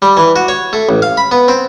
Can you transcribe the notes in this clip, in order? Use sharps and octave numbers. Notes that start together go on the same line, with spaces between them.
G3
E3
F#4
C#5
A3
A1
F5
B5
B3
C4